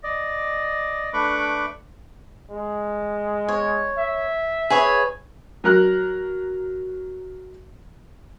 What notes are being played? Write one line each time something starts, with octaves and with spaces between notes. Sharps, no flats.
D5 D#5
A3 D4 B4 B5 C#6 D6
G#3
C#5
E5
G#4 B4 C#5
F#3 A#4 F#6